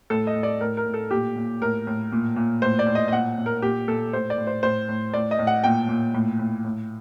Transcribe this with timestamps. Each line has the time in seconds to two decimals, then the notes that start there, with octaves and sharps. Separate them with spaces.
0.10 A2 A4
0.27 D#5
0.35 A2
0.43 D5
0.61 A2 A#4
0.77 A#4
0.86 A2
0.94 A4
1.11 A#2 G4
1.36 A#2
1.61 A2 A#4
1.87 A2
2.12 A#2
2.36 A#2
2.62 A2 C5
2.79 D5
2.87 A2
2.95 D#5
3.08 D#5
3.12 A#2 F#5
3.38 A#2
3.46 A#4
3.62 A#2 G4
3.88 A#2 A4
4.13 A2 C5
4.30 D5
4.38 A2
4.47 C5
4.63 A2 C5
4.89 A2
5.14 A2 D5
5.31 D#5
5.39 A2
5.47 F#5
5.64 A#2 G5
5.89 A#2
6.14 A2
6.39 A2
6.64 A2